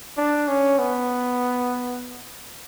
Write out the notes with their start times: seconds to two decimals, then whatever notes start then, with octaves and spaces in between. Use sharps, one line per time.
0.18 D4
0.48 C#4
0.79 B3